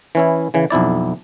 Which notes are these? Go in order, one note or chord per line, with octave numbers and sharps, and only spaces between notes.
E3 C#4 E4
C#3 E3
B1 F2 E4 D5